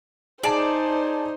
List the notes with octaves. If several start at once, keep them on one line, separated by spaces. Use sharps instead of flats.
D#4 G#4 C5 D5 A5